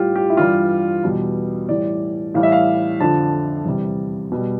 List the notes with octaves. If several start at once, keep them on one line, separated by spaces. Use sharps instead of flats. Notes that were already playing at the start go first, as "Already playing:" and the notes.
Already playing: A2 G3 F4 G4
G4
E4
G2 E3 G3 F4
E2 B2 G3
A2 E3 G3 D5
A2 E3 G3 F5
E5
F5
F2 D3 F3 A5
E2 C3 G3
B2 G3